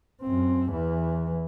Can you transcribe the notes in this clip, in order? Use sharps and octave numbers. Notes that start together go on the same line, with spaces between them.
F#2 C4
E2 E3